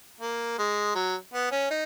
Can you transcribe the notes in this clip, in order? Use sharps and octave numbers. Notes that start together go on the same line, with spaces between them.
A#3
G#3
F#3
B3
C#4
D#4